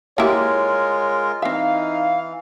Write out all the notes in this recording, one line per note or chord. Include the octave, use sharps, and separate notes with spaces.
G#3 A#3 E4 F4 G4 A#4 C#5
E3 C4 D#4 E5 F5